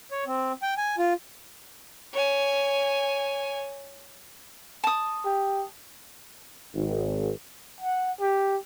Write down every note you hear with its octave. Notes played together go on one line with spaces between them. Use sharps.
C#5
C4
G5
G#5
F4
C#5 G#5
A5 D#6
G4
G#1
F#5
G4